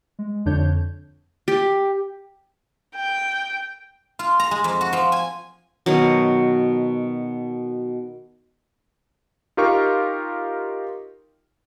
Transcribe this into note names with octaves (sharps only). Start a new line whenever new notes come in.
G#3
F2 D3 D4 C#5 G6
G4
G5
F4
A#5
G#3
F2
F#4
F3
G#5
B2 D#3 F#3
D#4 F4 G4 A#4 F5 C#6